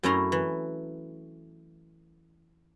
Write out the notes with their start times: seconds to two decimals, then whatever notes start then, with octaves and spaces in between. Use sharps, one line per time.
0.03 F#2 A3 C#4 E4 A#5 C6
0.32 E3